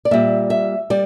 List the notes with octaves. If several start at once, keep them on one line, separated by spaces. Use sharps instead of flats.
D5
A#2 G3 E5
E5
G3 D5